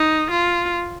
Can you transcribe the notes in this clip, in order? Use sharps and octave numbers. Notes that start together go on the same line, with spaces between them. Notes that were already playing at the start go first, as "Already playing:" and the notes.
Already playing: D#4
F4